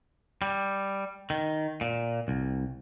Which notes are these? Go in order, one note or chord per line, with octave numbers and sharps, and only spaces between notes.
G3
D#3
A#2
C2